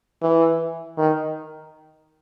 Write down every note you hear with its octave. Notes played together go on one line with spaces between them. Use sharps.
E3
D#3